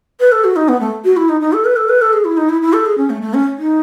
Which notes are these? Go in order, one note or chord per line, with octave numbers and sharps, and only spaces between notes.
B4
A4
F#4
D#4
B3
A3
F#4
E4
D#4
D#4
A4
B4
A4
B4
A4
G#4
E4
D#4
E4
E4
A4
G#4
C#4
A3
A3
C#4
D#4